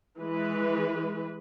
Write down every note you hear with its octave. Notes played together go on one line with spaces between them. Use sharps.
E3 G#3 B4